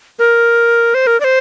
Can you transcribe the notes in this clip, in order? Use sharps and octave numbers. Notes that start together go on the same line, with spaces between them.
A#4
C5
A#4
D5
C5